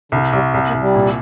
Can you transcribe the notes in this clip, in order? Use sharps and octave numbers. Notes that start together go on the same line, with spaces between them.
C2 D3
C2 G3
C2 G3
A#3
C2
G3
A#2